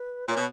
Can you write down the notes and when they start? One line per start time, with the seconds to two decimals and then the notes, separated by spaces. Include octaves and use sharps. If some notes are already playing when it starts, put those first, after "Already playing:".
Already playing: B4
0.28 A#2 C#5
0.37 B2